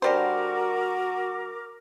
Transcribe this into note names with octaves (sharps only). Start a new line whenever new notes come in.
D3 G3 F#4 A#4 C5 D6